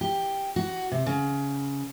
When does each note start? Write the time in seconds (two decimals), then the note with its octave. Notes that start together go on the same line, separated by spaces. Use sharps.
0.01 G4
0.56 F#4
0.92 C3
1.06 C#3